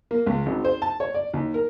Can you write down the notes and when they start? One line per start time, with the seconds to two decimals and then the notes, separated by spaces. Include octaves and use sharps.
0.11 A#3
0.26 C#2
0.46 G#1
0.65 C5
0.82 A5
1.00 C#5
1.14 D5
1.34 D#2
1.54 A#4